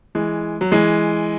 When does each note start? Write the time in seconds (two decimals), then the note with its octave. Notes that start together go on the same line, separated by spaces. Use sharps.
0.15 E3 G#3
0.61 F#3
0.72 E3 G#3